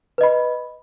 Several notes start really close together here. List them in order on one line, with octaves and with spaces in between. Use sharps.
B4 D#5 B5